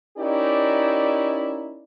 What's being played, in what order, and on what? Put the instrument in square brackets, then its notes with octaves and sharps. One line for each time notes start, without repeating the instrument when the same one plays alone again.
[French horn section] C#4 D#4 E4 G4 A#4 D5